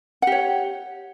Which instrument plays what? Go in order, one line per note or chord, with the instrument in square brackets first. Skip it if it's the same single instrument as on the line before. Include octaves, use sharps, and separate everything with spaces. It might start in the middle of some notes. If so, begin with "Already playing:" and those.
[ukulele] F#5
G4
C#5